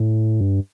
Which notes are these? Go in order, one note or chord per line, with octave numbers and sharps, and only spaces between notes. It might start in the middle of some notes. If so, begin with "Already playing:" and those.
Already playing: A2
G2